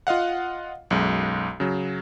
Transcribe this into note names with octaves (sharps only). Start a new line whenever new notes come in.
F4 D#5 F5 F#5
B1 F#2 G#3
C#3 F#3